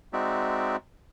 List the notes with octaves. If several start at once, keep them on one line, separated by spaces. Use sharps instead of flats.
G#3 C4 D#4 F#4 D5 E5